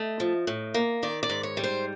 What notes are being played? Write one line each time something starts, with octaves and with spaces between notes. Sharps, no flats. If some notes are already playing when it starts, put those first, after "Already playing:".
Already playing: A3 D#5
F3
A2
A#3
D#3 D5
D5
G#2
C#5
G3
C5